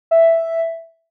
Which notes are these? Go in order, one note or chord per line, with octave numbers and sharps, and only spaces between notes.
E5